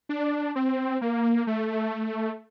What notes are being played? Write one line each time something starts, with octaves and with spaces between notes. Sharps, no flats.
D4
C4
A#3
A3